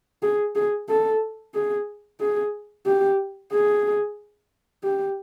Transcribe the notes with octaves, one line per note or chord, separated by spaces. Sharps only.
G#4
G#4
A4
G#4
G#4
G4
G#4
G4